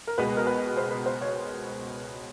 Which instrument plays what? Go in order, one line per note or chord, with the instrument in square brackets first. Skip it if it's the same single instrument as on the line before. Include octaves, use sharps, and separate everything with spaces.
[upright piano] A#4
[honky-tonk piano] C#2 B2 G#3 B3 [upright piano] B4
[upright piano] A#4
B4
C5
B4
C5
C#5